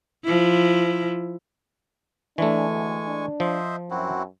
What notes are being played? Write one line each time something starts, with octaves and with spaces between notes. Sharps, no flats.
F3 E4
E3 G#3 A3 D4 G#5 C#6
D2
D4
F3 C5 D#5 E5
F#2 C4 E4 F#4